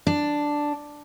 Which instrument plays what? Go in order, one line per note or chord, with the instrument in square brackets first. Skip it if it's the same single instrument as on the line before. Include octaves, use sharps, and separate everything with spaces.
[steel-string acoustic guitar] D4